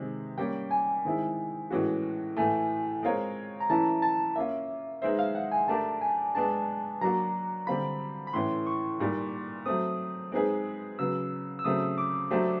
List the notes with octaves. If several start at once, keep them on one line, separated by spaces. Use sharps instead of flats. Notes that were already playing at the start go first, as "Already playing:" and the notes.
Already playing: C3 D#3 G#3 C4
G3 A#3 C#4 G5
G#5
D#3 G#3 C4 E4
A2 E3 G#3 C#4 F#4
A2 E3 A3 G#5
G#3 C4 F4 A#4 C#5
A#5
E3 A3 C#4 E4 A5
A5
A#3 C#4 F4 E5
G#3 B3 D#4 G#4 C5 E5
F5
F#5
G#5
A3 D4 G4 A#4 A5
G#5
G#3 B3 D4 A5
F#3 A#3 D4 F#4 A#5
D3 G3 C4 F4 B5
B5
A2 E3 A3 C#4 C6
C#6
A#2 G3 A#3 D#4
F#3 A3 C4 D#6
G#3 C4 D#4 G#4 B4
C#3 F#3 B3 E6
E6
C#3 F#3 A3 C4 D#6
D6
F#3 A3 D4 G4 C5